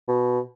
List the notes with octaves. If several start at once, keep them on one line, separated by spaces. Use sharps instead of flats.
B2